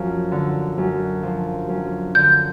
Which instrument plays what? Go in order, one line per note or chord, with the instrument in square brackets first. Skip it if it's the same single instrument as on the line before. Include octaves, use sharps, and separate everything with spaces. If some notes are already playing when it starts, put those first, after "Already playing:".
Already playing: [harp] F#2 F3
D3
F#2
F3
F#2
[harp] D3 [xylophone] G6